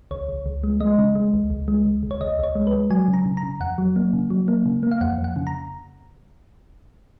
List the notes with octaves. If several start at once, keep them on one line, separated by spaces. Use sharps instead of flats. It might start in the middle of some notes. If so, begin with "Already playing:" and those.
C#2 C#5
C#2
C#2
G#3
G#3 D#5
C#3
G#3
C#2
C#2
G#3
C#2
C#2
C#5
C#2 D#5
C#2 C#5
G#3
B4
G#3
F#3 G#5
C#3
A#5
C#3
A#5
C#3
F2 F#5
F#3
A#3
C#3
F#3
A#3
C#3
A#3
F5
F2 F#5
F2
F#5
C#3
A#5